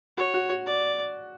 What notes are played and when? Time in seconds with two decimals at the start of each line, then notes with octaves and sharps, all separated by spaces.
0.17 F#4 C#5
0.34 F#4
0.49 F#4
0.67 D5